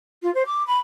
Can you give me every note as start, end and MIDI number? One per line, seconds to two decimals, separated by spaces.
0.23 0.33 65
0.34 0.43 72
0.46 0.65 86
0.67 0.79 83